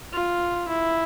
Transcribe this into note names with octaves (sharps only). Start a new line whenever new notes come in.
F4
E4